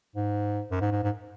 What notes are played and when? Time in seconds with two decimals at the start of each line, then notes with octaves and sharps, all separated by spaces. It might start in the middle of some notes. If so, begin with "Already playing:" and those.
0.16 G#2
0.71 F#2
0.81 G#2
0.92 G#2
1.03 G#2